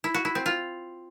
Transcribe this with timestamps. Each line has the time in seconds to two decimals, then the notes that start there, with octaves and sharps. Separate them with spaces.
0.04 E4
0.14 F#4
0.25 E4
0.35 C4
0.46 F4